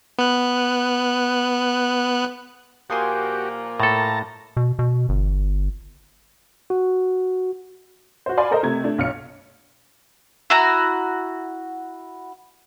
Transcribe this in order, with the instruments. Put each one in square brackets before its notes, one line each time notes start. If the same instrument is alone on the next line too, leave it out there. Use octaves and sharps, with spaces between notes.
[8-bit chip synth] B3 F#6
[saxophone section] A#2 F3 A#3 [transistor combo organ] F#4 G4 [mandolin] G#5 C6 D#6
[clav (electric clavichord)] A2 A4 [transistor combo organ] A5 A#5
[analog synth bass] B2
B2
G1
[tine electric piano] F#4
[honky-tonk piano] F#4 C5
D5 F5 G#5 B5 C6
A4 A#4 C5 D#5
C3 A3 G#6
A3 D4
B1 F6 C#7
[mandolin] E4 F#4 A#5